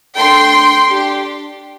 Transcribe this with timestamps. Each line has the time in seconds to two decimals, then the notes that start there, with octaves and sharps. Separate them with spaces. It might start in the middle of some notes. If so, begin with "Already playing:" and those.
0.16 A3 D4 A4 G5 C6
0.89 D4 G4